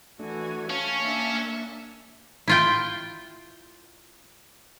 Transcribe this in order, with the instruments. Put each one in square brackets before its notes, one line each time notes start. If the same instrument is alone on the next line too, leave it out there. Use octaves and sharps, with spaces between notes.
[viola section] E3 F#4 G#5 [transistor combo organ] A3 D4
[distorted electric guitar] C#4 [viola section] C#5 [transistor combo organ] F5 A5
[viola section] A#3 D4 E5
[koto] E4 F4 G5